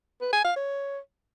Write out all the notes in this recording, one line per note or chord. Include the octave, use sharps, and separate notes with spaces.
B4
G#5
F5
C#5